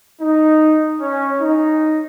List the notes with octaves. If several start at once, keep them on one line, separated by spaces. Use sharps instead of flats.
D#4
C#4
D#4